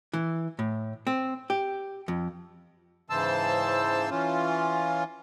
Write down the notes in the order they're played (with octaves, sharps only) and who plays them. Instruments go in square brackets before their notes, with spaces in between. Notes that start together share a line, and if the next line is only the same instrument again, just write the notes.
[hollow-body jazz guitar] E3
A2
C4
G4
F2
[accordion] G#2 C#3 E3 C5 A5 E6
E3 C#4 F4